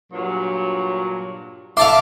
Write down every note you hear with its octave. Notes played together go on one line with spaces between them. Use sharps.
G2 A#2 F#3
D3 E5 F5 A5 C6 D6